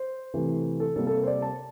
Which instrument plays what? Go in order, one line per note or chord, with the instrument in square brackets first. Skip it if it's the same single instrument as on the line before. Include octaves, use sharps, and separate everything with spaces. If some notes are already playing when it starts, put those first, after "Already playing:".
Already playing: [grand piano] C5
C3 E3 A3
A4
C3 G3 A#3 A4
A4
A#4
C5
D5
A5